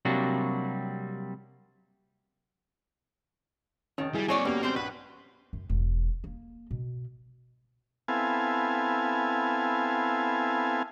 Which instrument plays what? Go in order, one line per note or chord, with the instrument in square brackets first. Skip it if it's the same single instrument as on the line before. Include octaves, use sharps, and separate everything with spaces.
[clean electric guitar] C3 F#3 G3 A#3 D4 F#4
[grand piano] F1 D#4 A6 [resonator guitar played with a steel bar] D#3 [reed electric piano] C#4
[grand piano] F#3 G#4 G#6 [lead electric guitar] G3 [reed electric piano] E4
[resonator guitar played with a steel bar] F#3 C#5 D5 [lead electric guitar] A#3 C4 [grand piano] G#5
[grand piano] F1 F#4 C#6 [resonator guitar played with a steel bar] G3 [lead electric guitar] A#3 [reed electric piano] B3 C#4 G4
[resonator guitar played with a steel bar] G3 G#3 C4 [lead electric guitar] C5
[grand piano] A#1 B5 [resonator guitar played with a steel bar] F#4 [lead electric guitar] B4
[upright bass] F#2
E1
A#3
B2
[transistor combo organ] B3 C4 E4 A4 F5 G#5